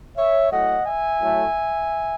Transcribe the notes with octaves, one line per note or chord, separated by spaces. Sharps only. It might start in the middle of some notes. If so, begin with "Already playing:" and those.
C#5 E5
A2 F#3 A3 D#5 F#5
E5 G#5
A2 F#3 A3